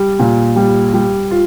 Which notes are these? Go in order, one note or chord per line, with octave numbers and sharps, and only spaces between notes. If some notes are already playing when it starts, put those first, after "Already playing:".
Already playing: G3
A#2
G3
G3
F4